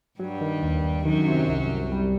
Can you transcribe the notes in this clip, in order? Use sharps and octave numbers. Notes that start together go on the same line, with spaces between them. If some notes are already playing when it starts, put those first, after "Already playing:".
G2 F#3 G3
D#3
D#2
D#2
F#2 D#3 F#3
C3
C2
C2
G3